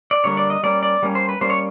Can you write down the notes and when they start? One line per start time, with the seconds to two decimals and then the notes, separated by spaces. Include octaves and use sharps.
0.11 D5
0.24 D3 G3 A#3 C#5
0.37 D5
0.50 D#5
0.63 G3 A#3 C#4 D5
0.83 D5
1.03 G3 A#3 C#4
1.15 C5
1.29 B4
1.41 G3 A#3 C#4 C5
1.50 C#5